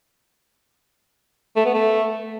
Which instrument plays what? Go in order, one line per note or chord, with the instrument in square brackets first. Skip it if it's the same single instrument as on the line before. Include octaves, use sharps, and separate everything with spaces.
[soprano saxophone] A3
B3
A3